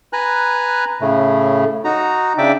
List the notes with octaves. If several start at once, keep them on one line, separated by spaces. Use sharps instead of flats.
B4 G#5 A#5 F#6
A2 C#3 A3
D#4 F#4 A#5
C#3 D4 D5 E5 G5 D6